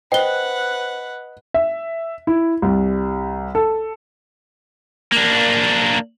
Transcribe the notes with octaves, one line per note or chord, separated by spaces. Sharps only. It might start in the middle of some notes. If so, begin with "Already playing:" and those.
B4 C5 D#5 F#5 G5 G7
E5
E4
C2
A4
A#3 D4